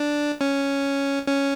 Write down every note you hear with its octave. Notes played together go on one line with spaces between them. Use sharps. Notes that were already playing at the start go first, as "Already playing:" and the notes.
Already playing: D4
C#4
C#4